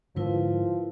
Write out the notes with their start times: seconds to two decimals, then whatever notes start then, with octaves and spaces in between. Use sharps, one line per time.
0.16 G#2 D3 F3 E4 A#4 B4